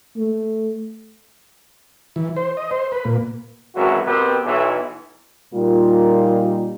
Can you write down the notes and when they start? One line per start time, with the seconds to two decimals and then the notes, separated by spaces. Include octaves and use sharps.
0.17 A3
2.16 E3
2.37 C5
2.57 D#5
2.71 C5
2.92 B4
3.05 A#2
3.75 G#1 F#2 E3 F#4
4.05 B2 B3 C4 G4 A#4
4.45 B1 E3
5.54 A#2 G3 A#3 D#4 F4